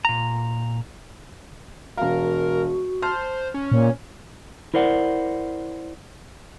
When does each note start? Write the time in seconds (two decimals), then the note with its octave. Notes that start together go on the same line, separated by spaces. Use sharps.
0.05 A#2 A#5
1.97 E1 F#4 A#4 F5
3.02 C5 A5 F6
3.54 C#4
3.72 A#2 C#5
4.74 E4 A#4 C5 D5 F#5